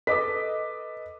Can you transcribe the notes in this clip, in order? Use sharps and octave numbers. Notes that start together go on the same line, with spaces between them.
A4 B4 D#5 D6 D#6 B6